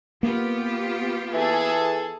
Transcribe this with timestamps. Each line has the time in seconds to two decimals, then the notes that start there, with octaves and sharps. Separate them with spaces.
0.23 A#3 B3 F4 G4
1.34 E3 G#4 A4